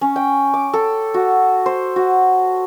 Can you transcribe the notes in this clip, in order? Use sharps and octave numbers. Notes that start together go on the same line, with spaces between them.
C#4
G5
D6
A4
F#4
C5
F#4